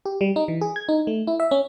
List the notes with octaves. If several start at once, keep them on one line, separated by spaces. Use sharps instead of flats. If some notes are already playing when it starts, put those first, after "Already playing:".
G4
G3
D#4
E3
G#4
G#6
D#4
A3
E4
E5
C#4